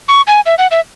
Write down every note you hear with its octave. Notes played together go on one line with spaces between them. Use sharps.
C#6
G#5
E5
F#5
E5